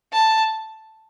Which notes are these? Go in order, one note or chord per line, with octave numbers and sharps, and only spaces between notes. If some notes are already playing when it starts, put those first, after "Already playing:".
A5